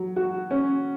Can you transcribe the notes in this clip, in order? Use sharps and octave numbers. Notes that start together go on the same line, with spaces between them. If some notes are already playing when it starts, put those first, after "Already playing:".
Already playing: F#3
F#4
C#4